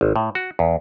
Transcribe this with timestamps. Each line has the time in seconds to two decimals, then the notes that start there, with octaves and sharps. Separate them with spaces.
0.01 G#1
0.16 A2
0.35 F#4
0.59 E2